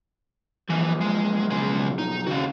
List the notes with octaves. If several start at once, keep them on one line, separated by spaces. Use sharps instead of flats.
B1 E3 F3
G#3
C#3 G#3
D#4
D#2 C#3 F#4 F5